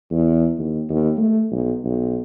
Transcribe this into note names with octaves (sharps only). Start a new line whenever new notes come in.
E2
D#2
D#2
A3
B1
B1